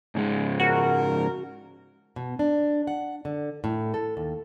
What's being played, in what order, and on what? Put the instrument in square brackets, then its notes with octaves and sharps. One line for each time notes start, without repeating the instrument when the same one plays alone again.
[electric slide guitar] G#2 C#3 G#3
[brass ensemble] F#1 A#4 [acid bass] F#4
[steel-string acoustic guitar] B2
D4
F#5
D3
A2
A4
D#2